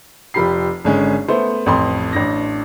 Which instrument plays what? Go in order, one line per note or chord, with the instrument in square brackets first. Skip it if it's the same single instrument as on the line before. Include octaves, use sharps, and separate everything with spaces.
[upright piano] F1 F3 G4 B5 C7
G#1 D3 G#3 C#4
A3 B3 C5
A1 F2 C6
A1 D4 A#6